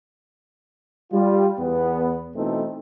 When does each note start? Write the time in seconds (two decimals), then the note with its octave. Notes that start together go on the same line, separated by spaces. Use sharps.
1.12 G3 F4
1.59 E2 B3
2.36 B2 E3 A3 C4 D#4 A4